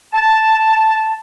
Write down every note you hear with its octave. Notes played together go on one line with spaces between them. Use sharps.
A5